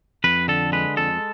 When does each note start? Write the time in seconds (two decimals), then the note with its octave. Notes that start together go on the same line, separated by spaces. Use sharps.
0.24 F2 B4
0.48 D3 A4
0.72 G#3 B4
0.97 F2 A4